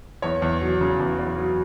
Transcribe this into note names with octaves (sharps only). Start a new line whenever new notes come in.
E2 C#5
E2
F#3
C#3
E2
E2
F#3